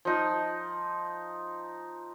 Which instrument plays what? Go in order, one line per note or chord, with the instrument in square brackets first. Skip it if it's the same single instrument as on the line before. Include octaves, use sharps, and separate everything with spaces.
[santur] F3 D#4